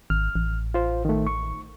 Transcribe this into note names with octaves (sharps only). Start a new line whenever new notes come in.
G#1 F6
A1
F4 C5
D#3 A3
C#6